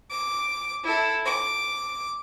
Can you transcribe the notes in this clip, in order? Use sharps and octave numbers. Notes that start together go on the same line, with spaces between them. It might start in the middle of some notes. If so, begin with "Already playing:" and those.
D6
E4 A4
D6